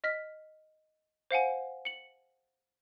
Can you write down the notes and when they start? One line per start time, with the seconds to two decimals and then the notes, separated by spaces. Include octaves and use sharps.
0.04 D#5 F6 B6
1.31 C5 F5 F#5 G#5
1.85 C#7 F#7